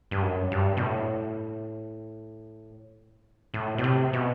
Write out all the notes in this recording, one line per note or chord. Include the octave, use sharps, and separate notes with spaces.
G2
F#2
G2
B2
A2
A2
B2
C3
B2